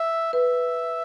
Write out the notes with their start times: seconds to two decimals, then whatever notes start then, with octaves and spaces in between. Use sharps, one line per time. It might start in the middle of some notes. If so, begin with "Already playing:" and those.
Already playing: E5
0.33 B4 E5